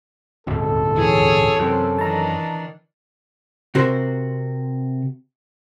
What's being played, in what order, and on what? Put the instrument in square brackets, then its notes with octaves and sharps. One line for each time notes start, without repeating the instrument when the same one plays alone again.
[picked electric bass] D#1 G#1 D2 [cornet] A4
[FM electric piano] E3 [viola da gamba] G#4 C#5
[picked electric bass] F#2 [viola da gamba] C3 C4
[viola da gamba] D#3 E3 D4 [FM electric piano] A5 A#5
[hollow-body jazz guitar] C3 F#4 A#4 C5